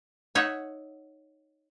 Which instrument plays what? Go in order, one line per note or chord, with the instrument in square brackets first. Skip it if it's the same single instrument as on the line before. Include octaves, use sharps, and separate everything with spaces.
[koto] D#4 C#5 E5 F#5